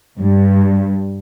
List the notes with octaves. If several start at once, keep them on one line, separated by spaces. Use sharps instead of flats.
G2